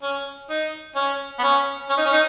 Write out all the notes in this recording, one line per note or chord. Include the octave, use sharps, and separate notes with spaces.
C#4
D#4
C#4
B3
C#4
C#4
D#4
C#4
D#4